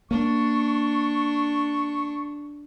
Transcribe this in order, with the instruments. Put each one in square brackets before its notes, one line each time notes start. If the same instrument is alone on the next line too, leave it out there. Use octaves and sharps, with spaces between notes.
[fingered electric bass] A#3 [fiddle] D4 [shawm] C#6